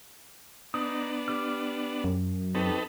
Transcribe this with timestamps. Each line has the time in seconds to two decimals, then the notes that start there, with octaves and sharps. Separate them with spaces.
0.74 B3 D4 D#4 D#6
1.28 G4 D6 F6
2.04 F#2
2.55 C4 D#4 F#4 G4 A4 B4